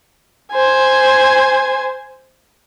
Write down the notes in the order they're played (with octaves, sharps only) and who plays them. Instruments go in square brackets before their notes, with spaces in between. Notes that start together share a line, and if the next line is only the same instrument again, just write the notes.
[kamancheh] C5 G#5